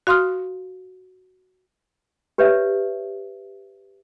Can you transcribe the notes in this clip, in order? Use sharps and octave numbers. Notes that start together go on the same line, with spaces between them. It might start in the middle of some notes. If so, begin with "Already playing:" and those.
F#4 F5 C6 D#6 F6
G4 B4 C#5 D5 E5